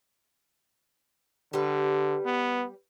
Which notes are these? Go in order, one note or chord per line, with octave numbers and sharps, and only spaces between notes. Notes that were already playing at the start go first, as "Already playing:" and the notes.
D3 G3 B4
B3